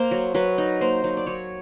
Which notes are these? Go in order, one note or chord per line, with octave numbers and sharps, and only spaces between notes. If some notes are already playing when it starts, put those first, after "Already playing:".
Already playing: A#3 C5
F#3
F#3 B4
D#4
A#3 C5
F#3
D5
F#3 C#5